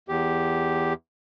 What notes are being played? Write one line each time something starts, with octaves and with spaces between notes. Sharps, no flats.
E2 G4